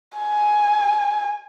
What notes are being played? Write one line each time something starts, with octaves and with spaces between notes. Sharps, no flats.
G#5